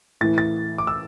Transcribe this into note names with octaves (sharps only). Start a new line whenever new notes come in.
A2 E3 A6
A6
D6
E6